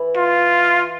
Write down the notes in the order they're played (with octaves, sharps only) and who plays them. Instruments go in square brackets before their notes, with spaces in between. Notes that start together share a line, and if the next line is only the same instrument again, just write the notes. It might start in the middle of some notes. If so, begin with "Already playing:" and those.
Already playing: [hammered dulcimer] E3
[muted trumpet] F4